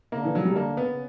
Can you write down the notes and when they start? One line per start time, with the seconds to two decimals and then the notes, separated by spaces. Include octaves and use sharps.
0.12 C#3 A#3
0.19 D3
0.25 E3
0.35 C#3 F#3
0.45 D3 G3
0.56 A#3
0.77 C#3 B3
0.92 C#3